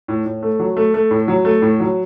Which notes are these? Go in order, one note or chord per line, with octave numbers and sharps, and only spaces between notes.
A2
A2
A3
F#3
A3
A3
A2
F#3
A3
A2
F#3